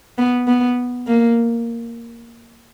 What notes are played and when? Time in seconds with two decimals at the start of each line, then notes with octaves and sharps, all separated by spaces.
0.18 B3
0.47 B3
1.07 A#3